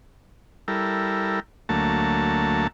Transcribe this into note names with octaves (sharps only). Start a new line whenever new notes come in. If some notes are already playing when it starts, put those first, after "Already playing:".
G3 E4 A4 A#4
D2 F#3 A3 A#3 A5